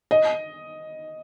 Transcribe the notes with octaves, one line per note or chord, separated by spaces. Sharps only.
D#5